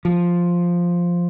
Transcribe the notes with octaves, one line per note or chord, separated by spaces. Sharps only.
F3